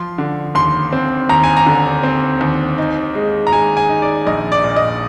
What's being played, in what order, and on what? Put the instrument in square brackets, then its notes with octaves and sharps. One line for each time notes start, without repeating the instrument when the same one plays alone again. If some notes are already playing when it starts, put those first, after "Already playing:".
Already playing: [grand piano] F3 C6
D3
D#2 C6
C4
D#2 A#5
G#5
A#5
D3
C4
D#2
D#4
G#3
A#5
G#3 G#5
G#5
D#4
D5
A#1 D#5
D5
A#2
D#5